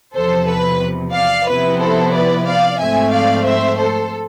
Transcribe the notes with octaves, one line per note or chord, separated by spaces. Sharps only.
E2 C3 F3 A4 C5
B4
D5 F5
C3 F3 B3 E4 B4
A4 C5
B4 D5
D5 F5
G#2 F3 A3 C4 E5 G#5
D5 F5
C5 E5
A4 C5